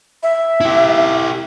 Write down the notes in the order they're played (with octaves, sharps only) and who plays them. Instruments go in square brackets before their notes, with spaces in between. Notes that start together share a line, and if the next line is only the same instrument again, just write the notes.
[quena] E5
[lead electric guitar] E4 G4